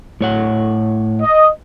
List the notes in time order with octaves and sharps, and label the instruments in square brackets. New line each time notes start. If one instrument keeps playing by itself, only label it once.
[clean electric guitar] A2 C#5 F#5
[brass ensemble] D#5